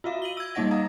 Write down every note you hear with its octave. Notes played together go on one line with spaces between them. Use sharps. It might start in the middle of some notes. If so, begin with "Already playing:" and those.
F4 F#4 E5 F5
D#7 F#7 G7
E6 G#6
G3 A#3 D#4 D#5 F#5 A#6
F5 A#5 D#6